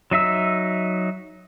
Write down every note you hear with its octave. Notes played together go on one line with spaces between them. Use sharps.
F#3 D#4 E5 E6